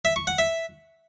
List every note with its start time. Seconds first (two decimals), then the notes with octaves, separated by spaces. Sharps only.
0.05 E5
0.16 C#6
0.27 F#5
0.39 E5